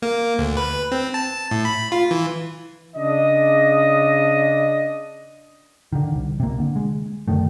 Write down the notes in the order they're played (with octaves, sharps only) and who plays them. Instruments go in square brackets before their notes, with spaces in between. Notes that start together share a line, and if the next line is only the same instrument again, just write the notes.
[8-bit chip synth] A#3
D2
B4
C4
A5
A2
B5
F4
E3
[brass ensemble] C#3 D4 D#5
[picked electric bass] D3 D#3
C2
C3 A#3
D3
G#3
F#2 D3 D#3 A3